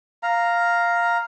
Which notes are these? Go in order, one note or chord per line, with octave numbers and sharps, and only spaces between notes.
F5 A#5